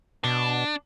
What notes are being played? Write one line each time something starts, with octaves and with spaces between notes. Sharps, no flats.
B2 D4